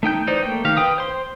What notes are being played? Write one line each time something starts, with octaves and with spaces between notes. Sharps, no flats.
A3 D#4 G5 G6
E3 D#4 C5 D5
A3 A#3 G5
D#3 G4 F5
B4 G5 D#6
C5 C6